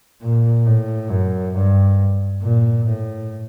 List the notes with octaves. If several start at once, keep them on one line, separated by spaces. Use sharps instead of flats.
A#2
A2
F#2
G2
A#2
A2